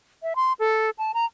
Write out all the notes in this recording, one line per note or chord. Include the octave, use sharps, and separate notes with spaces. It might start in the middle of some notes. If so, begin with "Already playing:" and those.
E5
C6
A4
A5
A#5